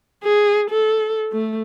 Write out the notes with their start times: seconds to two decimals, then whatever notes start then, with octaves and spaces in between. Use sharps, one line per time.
0.24 G#4
0.70 A4
1.32 A3